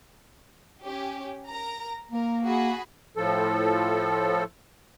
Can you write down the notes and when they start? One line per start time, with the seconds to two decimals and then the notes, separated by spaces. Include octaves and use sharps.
0.84 C#4 G4
1.47 A#4 A#5
2.11 A#3 A#4
2.43 F#4 G#4 B5
3.17 A2 F3 A4